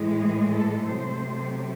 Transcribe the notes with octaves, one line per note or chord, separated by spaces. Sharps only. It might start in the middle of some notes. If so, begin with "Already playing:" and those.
Already playing: A2 E3 G#3
G#4
A4
C3 F#3 A3 C5